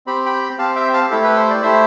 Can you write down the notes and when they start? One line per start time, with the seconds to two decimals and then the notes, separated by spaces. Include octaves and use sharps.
0.07 C4 G4 B5
0.26 G5 B5
0.59 C4 G4 F5 A5
0.76 E5 G5
0.93 F5 A5
1.10 A3 E4 G4 A4
1.24 B4
1.36 C5
1.50 D5
1.63 A3 E4 G4 C5 E5